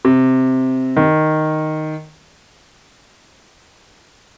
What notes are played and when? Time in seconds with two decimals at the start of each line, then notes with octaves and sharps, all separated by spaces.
0.05 C3
0.97 D#3